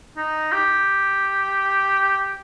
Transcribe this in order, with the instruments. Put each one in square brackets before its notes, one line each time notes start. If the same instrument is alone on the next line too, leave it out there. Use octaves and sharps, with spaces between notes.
[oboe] D#4
G4